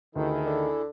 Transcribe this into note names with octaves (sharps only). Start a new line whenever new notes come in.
D2 D#3 E4 G#4 A4
D3